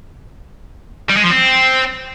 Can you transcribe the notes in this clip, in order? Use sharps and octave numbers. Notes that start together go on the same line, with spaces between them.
G3
G#3
F3
C4